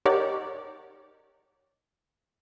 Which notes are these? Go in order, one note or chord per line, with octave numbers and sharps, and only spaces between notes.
D#4 G4 A#4 C#5 D5 F#5